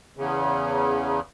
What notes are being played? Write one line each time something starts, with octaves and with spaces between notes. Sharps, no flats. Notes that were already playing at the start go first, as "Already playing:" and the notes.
E2 C#3